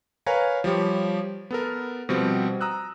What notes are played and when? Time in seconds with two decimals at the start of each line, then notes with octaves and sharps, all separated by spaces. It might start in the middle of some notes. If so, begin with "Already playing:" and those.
0.26 A#4 B4 C#5 F5 G#5 A#5
0.64 F3 G3 G4 C#5
1.51 B3 A4 A#4
2.09 B2 F3 G3 C4
2.61 A#5 D#6 E6 F#6